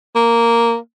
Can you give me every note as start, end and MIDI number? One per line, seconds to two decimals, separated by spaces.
0.15 0.76 58